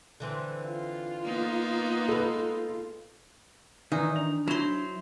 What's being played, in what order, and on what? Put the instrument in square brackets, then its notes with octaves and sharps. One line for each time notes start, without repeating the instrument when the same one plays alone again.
[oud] D3 E3 C4
[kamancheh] F4
[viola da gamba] A#3 B3 D#4
[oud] G#3 B4 [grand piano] A4
[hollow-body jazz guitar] D#3 [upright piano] E3 [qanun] D#4 [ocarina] D5
[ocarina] D4 [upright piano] F7
[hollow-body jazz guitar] F#3 E4 [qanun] C5 C6 [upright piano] E7 F7